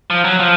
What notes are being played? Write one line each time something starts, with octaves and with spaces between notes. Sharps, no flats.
F3
F#3
F3